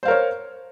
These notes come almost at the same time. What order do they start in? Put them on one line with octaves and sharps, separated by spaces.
C5 F5 A#4 C#5